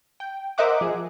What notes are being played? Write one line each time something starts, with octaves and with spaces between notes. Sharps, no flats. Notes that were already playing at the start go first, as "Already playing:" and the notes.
G5
A#4 C5 D#5 E5 F#5 D6
F3 G#4